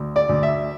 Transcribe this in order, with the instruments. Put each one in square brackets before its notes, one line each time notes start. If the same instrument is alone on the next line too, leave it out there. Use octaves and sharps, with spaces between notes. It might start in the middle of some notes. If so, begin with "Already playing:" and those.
Already playing: [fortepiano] D2
D5
D2
E5